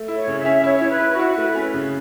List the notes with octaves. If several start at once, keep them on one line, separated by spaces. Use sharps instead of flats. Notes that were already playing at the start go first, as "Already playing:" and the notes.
Already playing: A3
E4
C#5
C#3
E5
C#4
E4 C#5
E4
B4
E4
F#4
E4
A3 B4
C#4
C#3